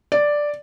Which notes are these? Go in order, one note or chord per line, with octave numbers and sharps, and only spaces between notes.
D5